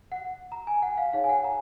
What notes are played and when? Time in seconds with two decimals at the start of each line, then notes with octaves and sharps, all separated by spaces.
0.12 F#5
0.52 A#5
0.67 G#5
0.82 F#5
0.98 F5
1.13 D#4 G#4 C#5 F5
1.24 G#5
1.29 F#5
1.44 A#5